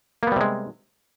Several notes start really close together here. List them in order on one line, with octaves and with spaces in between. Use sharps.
A#3 B3 G3 C3 G#3